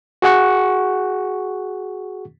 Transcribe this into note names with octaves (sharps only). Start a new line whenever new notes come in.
F#4 G#4 F#5 C#6